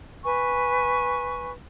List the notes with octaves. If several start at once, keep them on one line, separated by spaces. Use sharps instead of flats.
B4 G#5 C#6